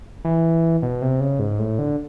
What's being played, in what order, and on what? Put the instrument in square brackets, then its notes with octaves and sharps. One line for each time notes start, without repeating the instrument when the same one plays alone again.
[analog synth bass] E3
B2
C3
C#3
G#2
A2
D3